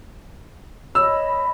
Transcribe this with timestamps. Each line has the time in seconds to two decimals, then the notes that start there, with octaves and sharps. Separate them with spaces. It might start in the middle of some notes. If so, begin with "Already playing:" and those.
0.95 C#5 D#5 B5 E6